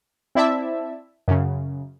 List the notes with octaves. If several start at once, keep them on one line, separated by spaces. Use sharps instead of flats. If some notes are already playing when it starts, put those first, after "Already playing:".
C4 E4 D5 E5 A5
F#2 C#3